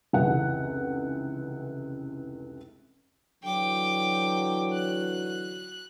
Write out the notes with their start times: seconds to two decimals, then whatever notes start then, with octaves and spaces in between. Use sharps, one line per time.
0.13 F1 C#2 E3 C#4 F#5
3.43 D3 E3 F#3 G5 D6
4.74 F#6